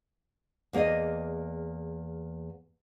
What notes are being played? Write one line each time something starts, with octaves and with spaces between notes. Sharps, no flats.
E2 A#3 G#4 D5 D#5